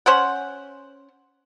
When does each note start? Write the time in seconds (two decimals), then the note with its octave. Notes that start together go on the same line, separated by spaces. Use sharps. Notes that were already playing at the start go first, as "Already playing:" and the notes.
0.06 C#4 C5 F#5